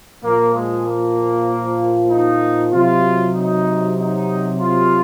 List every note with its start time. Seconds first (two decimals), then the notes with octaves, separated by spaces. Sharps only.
0.24 A#2 F3 A#3
0.54 G#3
0.86 A#3
2.10 D#4
2.73 C3 F#3 F4
3.36 D#4
3.97 D#4
4.60 F4